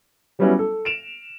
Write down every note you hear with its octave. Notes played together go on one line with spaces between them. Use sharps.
F#3 G3 B3 C#4 E4 F#4
A4
D7 E7 F7